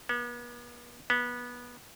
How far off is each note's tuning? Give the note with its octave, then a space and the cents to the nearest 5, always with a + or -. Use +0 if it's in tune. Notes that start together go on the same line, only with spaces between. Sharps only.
B3 -40
B3 -20